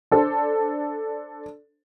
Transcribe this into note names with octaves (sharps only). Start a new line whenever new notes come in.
D4 A4 C5